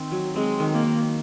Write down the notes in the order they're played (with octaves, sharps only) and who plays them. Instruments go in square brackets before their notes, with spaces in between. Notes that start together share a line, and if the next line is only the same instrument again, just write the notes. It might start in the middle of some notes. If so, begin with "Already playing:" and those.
Already playing: [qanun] D#3 C4
F#3
[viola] G#3 [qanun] C4
[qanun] D#3
[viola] A#3
[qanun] D#3